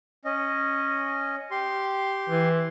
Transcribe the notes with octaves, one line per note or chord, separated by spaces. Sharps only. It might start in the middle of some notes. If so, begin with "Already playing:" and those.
C#4 D#5
G4 C6
E3